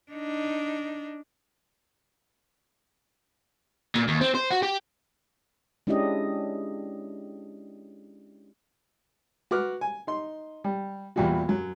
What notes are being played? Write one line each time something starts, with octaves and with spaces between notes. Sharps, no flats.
D4 D#4
A#2
D#2
C4
C5
F#4
G4
G#3 C#4 D4 E4 G4 D#5
F#4 B4 D6 F6 F#6
G#5
D#4 C6
G3
E2 A#2 G3 E4 F#4
F#2 F#3